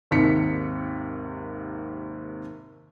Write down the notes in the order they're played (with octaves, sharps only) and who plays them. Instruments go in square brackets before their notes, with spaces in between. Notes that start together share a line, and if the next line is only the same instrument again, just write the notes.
[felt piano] G#1 D#2 C3 B6 C#7